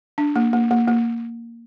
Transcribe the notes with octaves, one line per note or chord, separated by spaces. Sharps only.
D4
A#3
A#3
A#3
A#3